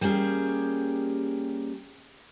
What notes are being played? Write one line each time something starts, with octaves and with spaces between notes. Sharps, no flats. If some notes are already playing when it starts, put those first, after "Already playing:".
G3 A#3 C#4 G4 G#4